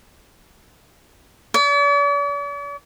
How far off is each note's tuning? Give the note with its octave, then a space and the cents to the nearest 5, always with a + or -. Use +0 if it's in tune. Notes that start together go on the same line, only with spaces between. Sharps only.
D5 -45